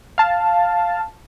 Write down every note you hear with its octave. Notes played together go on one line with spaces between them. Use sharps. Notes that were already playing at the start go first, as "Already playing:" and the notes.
F5 A5